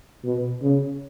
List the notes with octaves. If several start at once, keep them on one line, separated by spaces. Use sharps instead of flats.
B2
C#3